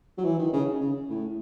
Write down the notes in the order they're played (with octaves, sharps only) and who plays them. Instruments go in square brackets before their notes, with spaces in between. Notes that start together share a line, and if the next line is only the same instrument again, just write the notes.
[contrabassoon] F#3
E3
D#3
C#3
C#3
A2